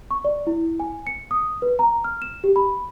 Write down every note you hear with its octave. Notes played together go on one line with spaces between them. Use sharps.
C#6
D5
E4
G#5
C#7
D#6
B4
A#5
F6
E7
G4
B5